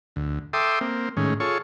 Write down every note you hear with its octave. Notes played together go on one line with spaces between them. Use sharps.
D2
A4 E5 G5 C6 D6 D#6
A#3 C4
A2 D#3 G#3 C#4
F4 G#4 A4 C#5 C#6